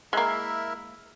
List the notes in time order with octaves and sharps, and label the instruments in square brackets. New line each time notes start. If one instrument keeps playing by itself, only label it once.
[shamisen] G#3 A#3 [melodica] E4 A#4 E5